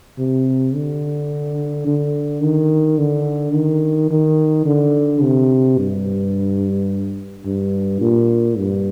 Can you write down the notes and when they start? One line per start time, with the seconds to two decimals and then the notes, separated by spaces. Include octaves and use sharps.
0.18 C3
0.75 D3
1.87 D3
2.43 D#3
2.98 D3
3.54 D#3
4.11 D#3
4.66 D3
5.22 C3
5.78 G2
7.45 G2
8.01 A#2
8.58 G2